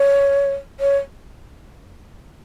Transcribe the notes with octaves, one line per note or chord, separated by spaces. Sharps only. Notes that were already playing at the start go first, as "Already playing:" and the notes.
Already playing: C#5
C#5